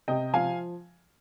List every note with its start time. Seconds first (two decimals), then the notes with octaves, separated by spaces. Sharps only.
0.08 C3 D#5 G5
0.34 F3 F5 G#5